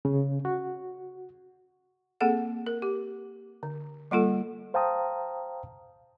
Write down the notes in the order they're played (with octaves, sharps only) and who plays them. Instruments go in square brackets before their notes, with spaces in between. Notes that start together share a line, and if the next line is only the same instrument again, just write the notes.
[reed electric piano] C#3
F#4
[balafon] A#3 C4 G#4 A4 F#5
A#4
G4
D3
G3 A#3 F4 A4
[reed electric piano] C5 F5 G5 A5 A#5 D#6